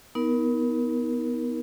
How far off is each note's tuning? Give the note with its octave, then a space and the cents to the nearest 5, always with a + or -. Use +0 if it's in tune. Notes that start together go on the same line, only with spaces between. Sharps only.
B3 +0 D#4 +30 A#4 +15